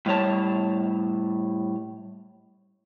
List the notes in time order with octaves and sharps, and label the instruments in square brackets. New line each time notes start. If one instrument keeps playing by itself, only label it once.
[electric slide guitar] A2 G3 C#5 A5